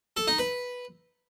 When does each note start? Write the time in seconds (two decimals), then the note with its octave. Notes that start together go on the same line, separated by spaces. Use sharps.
0.17 A4
0.27 D#4
0.38 B4